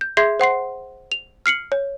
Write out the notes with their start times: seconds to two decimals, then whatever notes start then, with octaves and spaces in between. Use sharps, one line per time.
0.01 G6
0.17 G#4 E5 C6 G6 G#6 C7
0.40 C5 F#5 C6 C7
1.12 F7
1.46 F6 C7 C#7 F#7
1.72 C#5